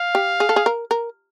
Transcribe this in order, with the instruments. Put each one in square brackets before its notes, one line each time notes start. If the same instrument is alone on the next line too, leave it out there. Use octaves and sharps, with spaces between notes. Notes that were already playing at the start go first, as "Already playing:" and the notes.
Already playing: [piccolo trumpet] F5
[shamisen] G4
G#4
A4
G#4
A#4
A#4